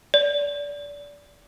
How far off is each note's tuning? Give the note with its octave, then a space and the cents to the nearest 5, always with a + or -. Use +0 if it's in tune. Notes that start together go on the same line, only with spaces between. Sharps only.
D5 -25